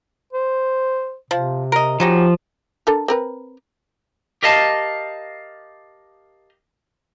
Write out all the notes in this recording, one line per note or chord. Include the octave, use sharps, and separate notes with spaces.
C5
C3 F3
A#4 D#5
F3 C#4 D#4 F#4 G4
D4 A4 A#4
C4 A#4 B4
G4 A#4 D#5 F5 A5